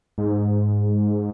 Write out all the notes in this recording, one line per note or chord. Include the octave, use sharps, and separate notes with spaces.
G#2